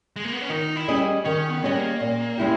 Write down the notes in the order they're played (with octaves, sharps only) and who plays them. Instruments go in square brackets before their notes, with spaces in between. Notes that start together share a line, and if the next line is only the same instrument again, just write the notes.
[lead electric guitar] G#3
A#3
B3
C#4
[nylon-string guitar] D#3 [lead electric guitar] D#4
[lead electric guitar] E4
[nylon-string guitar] G3 C#4 G#4 D#5
[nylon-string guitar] D#3 [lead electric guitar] C#4
[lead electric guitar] B3
[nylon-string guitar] G3 C#4 G#4 D#5 [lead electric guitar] B3
[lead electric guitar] A#3
[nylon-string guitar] A#2
G#3 C#4 E4 G4